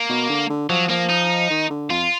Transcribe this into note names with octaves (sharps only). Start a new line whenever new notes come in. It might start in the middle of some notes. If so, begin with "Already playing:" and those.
Already playing: A#3
B2
D3
D3
F3 F#3
F3 A#3
D#4
D#3
D3
F2 F4